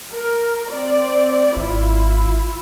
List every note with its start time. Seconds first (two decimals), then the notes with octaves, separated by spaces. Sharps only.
0.13 A#4
0.73 C4 D5
1.56 G#1 E4 F4